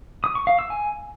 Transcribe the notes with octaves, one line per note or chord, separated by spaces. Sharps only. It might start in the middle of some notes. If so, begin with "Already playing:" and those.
D#6
C#6
F5
E6
G#5